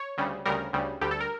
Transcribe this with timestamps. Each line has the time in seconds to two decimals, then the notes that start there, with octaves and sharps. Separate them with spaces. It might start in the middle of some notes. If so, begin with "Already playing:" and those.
Already playing: C#5
0.17 D2 C#3 G3
0.46 D2 C#3 G3 A#4
0.73 D2 C#3 G3
1.01 D2 D3 G3 G4
1.11 A4
1.20 A#4